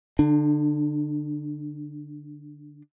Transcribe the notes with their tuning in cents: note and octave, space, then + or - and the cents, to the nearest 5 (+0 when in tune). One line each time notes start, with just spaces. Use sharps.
D3 +0 D4 +35